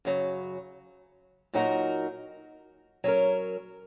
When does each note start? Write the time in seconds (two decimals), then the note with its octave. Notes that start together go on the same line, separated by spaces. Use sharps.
0.05 F#2 C#3 F#3
1.54 A#2 F#3 D#4 F#4 A#4
3.04 F#3 C#4 A#4